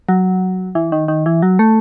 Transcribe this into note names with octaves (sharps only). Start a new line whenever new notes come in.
F#3
E3
D#3
D#3
E3
F#3
A3